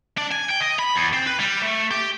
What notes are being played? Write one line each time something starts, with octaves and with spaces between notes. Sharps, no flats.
D4
G#5
G5
D#5
B5
E2
C4
B4
G3
A3
G4